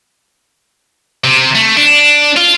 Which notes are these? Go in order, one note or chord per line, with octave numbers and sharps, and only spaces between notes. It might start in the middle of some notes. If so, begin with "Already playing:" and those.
C3
A3
D4
F4